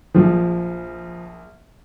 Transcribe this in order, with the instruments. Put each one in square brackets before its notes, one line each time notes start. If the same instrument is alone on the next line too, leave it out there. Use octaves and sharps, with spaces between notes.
[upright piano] A#1 G#4 [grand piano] F3